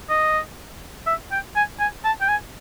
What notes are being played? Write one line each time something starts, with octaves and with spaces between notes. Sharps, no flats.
D#5
E5
G5
G#5
G#5
A5
G5
G#5